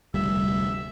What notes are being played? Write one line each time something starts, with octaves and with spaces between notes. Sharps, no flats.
F1 D2 G3 E5